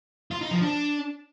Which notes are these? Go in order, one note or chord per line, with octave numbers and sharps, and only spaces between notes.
F4
D#4
F3
D4